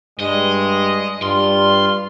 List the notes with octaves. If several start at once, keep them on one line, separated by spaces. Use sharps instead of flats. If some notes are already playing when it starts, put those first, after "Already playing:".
G2 G#3 D#5
G2 F4 C6